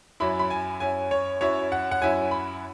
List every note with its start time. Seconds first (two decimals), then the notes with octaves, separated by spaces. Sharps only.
0.20 F#2 F#3 C#4 E4 B5
0.39 B5
0.50 G#5
0.80 F#2 F#3 C#4 E4 G#5
1.11 C#5
1.41 F#2 F#3 C#4 E4 C#5
1.72 F#5
1.91 F#5
2.01 F#2 F#3 C#4 E4 G#5
2.31 B5